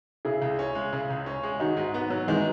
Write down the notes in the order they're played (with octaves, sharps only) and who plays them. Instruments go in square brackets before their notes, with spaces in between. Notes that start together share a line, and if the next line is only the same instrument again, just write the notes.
[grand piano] C#3 [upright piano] E4 G#4
[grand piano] C#2
C#4
G#3
C#3
C#2
C#4
G#3
[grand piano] D#3 [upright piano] D#4 F#4
[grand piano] G#2
B3
F#3
[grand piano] D#3 [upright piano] E3 G#3